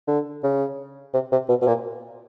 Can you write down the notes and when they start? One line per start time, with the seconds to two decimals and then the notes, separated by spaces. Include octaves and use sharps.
0.07 D3
0.43 C#3
1.14 C3
1.32 C3
1.49 B2
1.61 B2
1.67 A#2